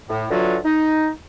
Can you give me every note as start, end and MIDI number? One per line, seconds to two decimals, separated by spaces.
0.10 0.27 45
0.31 0.57 50
0.31 0.57 52
0.31 0.57 54
0.31 0.57 65
0.31 0.57 66
0.65 1.10 63